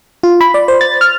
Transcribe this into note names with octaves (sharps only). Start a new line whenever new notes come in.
F4
B5
D5
C5
A6
F6